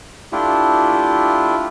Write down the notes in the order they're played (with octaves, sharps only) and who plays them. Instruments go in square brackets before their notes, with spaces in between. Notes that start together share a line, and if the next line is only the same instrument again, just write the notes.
[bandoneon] A3 D4 E4 F4 G4